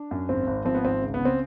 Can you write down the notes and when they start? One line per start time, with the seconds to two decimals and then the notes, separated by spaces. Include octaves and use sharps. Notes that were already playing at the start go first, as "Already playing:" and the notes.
Already playing: D4
0.11 F#2
0.29 G#1 C4
0.47 G#1
0.65 F3 C4
0.75 B3
0.84 G#1 C4
1.02 C#2
1.14 B3
1.20 C#3
1.25 C4